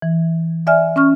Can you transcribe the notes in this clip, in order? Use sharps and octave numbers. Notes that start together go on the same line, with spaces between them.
E3
D5 E5 G#5 F6
C#4 C#6 F6